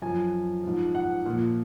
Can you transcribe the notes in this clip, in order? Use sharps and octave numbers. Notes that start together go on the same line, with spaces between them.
F#2 F3 G#5
G#2 F3
F#5
A#2 F3